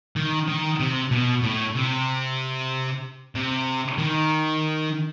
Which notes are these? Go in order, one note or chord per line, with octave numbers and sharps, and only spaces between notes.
D#3
D#3
C3
B2
A2
C3
C3
D#3